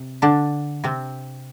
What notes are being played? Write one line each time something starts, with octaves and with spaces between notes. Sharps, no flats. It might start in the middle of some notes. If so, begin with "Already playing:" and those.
Already playing: C3
D3 D4
C3 C4